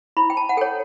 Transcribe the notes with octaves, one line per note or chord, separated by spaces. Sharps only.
E4 B5
G5
A5
F#5
A4 C#5 G5